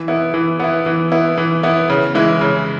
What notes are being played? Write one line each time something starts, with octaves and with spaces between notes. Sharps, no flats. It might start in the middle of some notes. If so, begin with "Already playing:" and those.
Already playing: E3
B3 E4
E3
B3 E4
E3
B3 E4
E3
B3 E4
C#3
E3 G#3 E4
C#3